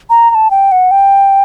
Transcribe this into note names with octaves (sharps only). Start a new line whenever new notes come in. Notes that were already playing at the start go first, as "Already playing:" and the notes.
A#5
A#5
A5
G5
F#5
G5